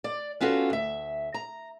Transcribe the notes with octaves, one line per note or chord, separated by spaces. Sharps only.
D5
B3 C#4 F4 F#4 A4
D2 E5
A#5